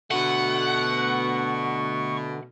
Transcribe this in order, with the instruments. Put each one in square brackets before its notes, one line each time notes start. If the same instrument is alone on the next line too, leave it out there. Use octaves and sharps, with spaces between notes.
[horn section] B2 [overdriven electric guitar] D3 A3 [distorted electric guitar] F#5 [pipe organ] C#6